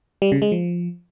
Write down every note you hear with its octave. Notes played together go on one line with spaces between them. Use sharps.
G3
C#3
G#3
F3